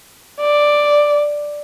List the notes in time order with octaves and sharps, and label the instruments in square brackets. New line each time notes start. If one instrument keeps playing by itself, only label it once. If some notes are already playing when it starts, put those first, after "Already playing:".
[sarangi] D5